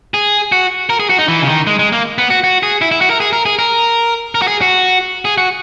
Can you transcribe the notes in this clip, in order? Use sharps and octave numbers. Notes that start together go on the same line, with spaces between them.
G#4
F#4
A#4
G#4
F#4
D#4
E3
C#3
D#3
G#3
G#3
A#3
B3
F#4
F#4
G#4
E4
E4
F#4
A#4
G#4
A#4
G#4
A#4
A#4
F#4
G#4
F#4
G#4
F#4